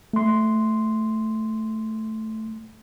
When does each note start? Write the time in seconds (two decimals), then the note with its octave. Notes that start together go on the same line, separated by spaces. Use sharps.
0.13 A3 C6